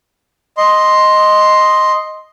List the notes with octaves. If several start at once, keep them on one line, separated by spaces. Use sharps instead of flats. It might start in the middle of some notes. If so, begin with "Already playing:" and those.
D#5 C6